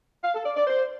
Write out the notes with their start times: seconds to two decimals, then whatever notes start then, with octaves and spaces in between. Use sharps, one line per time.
0.24 F5
0.34 A4
0.45 D5
0.56 D5
0.67 C5